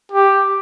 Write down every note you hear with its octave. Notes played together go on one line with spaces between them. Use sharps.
G4